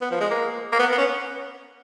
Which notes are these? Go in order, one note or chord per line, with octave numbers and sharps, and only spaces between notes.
B3
F3
G#3
A#3
A#3
B3
B3
C#4